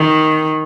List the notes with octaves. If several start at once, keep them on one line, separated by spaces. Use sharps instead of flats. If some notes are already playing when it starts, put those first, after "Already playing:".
Already playing: D#3